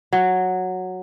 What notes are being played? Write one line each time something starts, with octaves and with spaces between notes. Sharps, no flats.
F#3